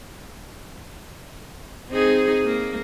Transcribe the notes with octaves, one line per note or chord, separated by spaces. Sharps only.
C4 D#4 G#4
A#3